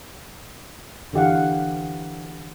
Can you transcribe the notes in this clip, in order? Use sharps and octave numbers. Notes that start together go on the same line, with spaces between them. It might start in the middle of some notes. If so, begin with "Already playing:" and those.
D3 E3 G4 F5 F#5